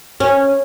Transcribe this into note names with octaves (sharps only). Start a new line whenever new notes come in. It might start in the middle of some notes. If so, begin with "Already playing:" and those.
C#4